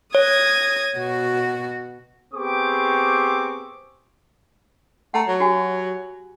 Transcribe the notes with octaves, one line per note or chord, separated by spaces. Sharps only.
C#5 D#6 G#6 A#6
B2 F#4
B3 C4 G4 G#4 C#6 D6
A3 F#5 A#5
F#3
F#4 G4 G#5